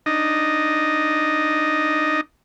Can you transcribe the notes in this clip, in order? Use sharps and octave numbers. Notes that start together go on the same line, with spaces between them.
D4 D#4 D#5